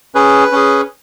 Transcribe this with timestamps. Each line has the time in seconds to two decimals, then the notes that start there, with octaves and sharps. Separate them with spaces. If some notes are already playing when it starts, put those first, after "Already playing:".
0.15 C#4 G#4 B4
0.52 C#4 G#4